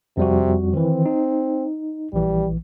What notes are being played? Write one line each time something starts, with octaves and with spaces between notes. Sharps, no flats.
F2 C3 G3 F#4
D#3 E3 C4
D#4
A#1 E3 G3